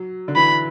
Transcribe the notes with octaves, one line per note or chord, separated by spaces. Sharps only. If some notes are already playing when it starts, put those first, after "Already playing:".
Already playing: F#3
D3
E3 B5